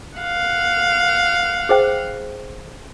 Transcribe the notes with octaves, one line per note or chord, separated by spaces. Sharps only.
F5 F#5
G#4 C5 G5